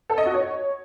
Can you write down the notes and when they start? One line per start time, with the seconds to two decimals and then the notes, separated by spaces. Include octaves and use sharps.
0.10 A4
0.18 D#5
0.26 F#4
0.34 C#5